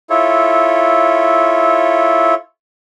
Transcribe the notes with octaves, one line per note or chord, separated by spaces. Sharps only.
E4 F4 A4 C#5